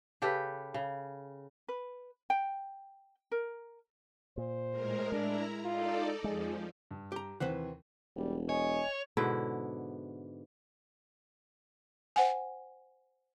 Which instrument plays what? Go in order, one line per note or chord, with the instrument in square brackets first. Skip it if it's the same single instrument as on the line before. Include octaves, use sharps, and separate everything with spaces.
[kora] C#3 G4 A4 B4
C#3
[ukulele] B4
G5
A#4
[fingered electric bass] A#2 [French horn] C5
[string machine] A2 G#3 A#4
[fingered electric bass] G#3 [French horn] D4 [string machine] E4 A#5
[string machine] D#4 A4 D5 [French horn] F4
[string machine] F2 F3 [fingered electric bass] G#3 [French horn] G#4
[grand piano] G2
[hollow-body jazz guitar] G4 A#5
[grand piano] D#2 C3 E3 [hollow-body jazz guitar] B4 C5 F#5
[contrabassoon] E1 [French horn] G3
[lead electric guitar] C#5 [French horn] D#5 [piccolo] G#5
[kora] G#2 B2 D3 E4
[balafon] C5 F#5 G#5